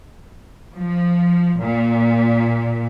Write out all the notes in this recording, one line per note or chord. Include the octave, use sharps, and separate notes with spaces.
F3
A#2